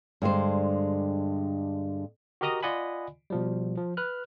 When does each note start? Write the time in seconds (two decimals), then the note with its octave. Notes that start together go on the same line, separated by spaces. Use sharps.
0.22 G2 D3 G#3 C5
2.41 F#4 G4 A#4 D#5 A#5 D#6
2.63 F4 D5 D#5 F#5 G#5 B5
3.30 B2 F3 G3
3.78 F3
3.97 B4 F6 F#6